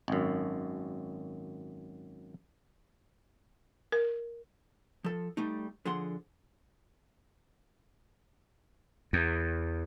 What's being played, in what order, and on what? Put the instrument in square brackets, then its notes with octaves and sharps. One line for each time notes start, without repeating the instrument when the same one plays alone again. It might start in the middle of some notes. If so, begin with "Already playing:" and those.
[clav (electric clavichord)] G#1 F#2
[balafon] A#4
[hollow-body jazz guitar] F3 A4
G3 A3 D#4
D3 F3 G#4 F#5 C6
[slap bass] E2